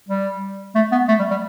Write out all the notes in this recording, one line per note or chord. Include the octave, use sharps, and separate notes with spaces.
G3
A3
B3
A3
G3
G3